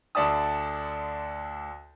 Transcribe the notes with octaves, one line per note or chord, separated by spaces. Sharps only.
D2 D3 D5 E5 A5 D#6